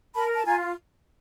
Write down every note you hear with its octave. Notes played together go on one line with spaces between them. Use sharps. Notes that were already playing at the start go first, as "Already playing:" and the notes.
A#4 A5 B5
A5
F4 G#5 A#5